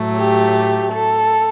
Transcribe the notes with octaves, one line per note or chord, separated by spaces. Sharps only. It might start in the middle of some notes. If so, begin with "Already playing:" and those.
Already playing: A2 F#3 A3
G4
A4